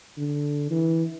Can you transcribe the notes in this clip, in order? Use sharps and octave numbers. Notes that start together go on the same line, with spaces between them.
D3
E3